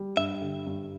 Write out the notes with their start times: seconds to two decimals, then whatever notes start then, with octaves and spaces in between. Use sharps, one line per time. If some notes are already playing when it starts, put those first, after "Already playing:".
Already playing: G3
0.16 G2 E5
0.41 D3
0.67 G2